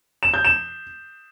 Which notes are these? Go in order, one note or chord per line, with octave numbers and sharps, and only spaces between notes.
E7
G6
E7